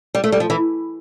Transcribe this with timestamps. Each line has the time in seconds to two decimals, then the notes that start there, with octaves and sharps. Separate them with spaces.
0.15 G3
0.24 A3
0.32 G3
0.40 F3
0.50 E3